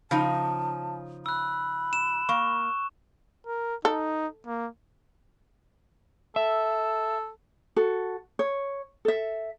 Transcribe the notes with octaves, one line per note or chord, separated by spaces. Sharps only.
C#3 F3 D#4 A5
B5 E6 F#6
E7
A#3 C#6
A#4
D#4 A4
A#3
A4 E5
F#4 A4
C#5
A4 E5